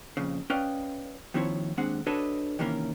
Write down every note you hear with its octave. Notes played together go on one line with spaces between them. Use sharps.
F2 A#2 C#3
C#4 B4 D5 D#5 F5 G5
D#2 D#3 F3 C4 E4 C#5
D#2 G#3 C4 D4 F#5
D4 F#4 A4 B4 C#5 D#5
C3 D#3 E3 A#3 C#4 A#4